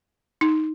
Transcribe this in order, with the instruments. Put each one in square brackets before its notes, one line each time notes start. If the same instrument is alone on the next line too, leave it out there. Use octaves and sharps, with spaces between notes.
[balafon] D#4